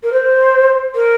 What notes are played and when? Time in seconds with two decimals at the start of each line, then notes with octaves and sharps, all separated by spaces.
0.03 A#4
0.12 C5
0.95 A#4